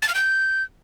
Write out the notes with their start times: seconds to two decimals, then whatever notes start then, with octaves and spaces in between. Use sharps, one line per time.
0.02 A6
0.08 F6
0.15 G6